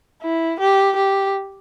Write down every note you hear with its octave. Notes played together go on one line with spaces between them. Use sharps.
E4
G4
G4